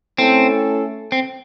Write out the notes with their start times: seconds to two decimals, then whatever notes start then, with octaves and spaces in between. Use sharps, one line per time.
0.18 A3 C4 C#4 E4 A4
1.12 C4